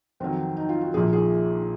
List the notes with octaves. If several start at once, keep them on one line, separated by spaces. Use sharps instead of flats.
F2 D#3 F#3 C4
D#4
F4
F#4
A#1 A#2 F3 G#4
G#4